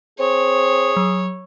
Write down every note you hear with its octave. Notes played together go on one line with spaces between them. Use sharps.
C4 G#4 C#5
F#3